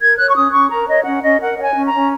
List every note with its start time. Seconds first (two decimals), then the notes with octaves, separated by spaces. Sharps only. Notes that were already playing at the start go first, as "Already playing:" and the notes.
0.01 A#4 G#6
0.17 C#5 F#6
0.29 C#6
0.35 C#4 D#6
0.53 C#4 C#6
0.70 A#4 A#5
0.87 C#5 D#5
1.05 C#4 F#5
1.22 C#4 D#5
1.41 A#4 F#5
1.58 C#5 F#5
1.64 G#5
1.75 C#4
1.87 A#5
1.94 C#4